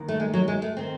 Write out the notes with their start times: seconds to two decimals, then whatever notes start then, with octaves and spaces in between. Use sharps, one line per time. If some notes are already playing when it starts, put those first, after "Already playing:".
Already playing: D#2 D#3
0.08 A3
0.20 G#3
0.34 F#3
0.48 G#3
0.62 A3
0.77 D#3 C4